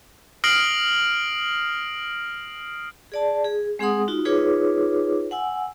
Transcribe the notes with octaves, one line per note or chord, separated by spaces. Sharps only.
D#6 F6 A#6 C7 D7 F#7
G#4 D5 A5
G#4
G#3 C4 G#4 F#5 C6 D#6
D#4 F4 F#4
D#4 F4 G#4 B4 C#5 D6
F#5 G#5 E6